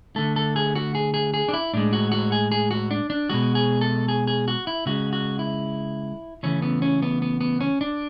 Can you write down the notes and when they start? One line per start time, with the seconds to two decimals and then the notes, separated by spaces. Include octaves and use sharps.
0.16 D3 A3 A4
0.36 A4
0.56 G#4
0.75 F#4
0.95 G#4
1.14 G#4
1.34 G#4
1.48 D4
1.53 E4
1.74 A2 G#3 D4
1.93 F#4
2.12 F#4
2.32 G#4
2.52 G#4
2.71 F#4
2.91 D4
3.10 D4
3.30 B2 G#3 F#4
3.55 G#4
3.81 A4
4.08 G#4
4.27 G#4
4.48 F#4
4.67 E4
4.86 C#3 G#3 F#4
5.13 F#4
5.39 E4
6.43 C#3 E3 A3 C#4
6.62 B3
6.82 C#4
7.02 B3
7.22 B3
7.41 B3
7.61 C#4
7.81 D4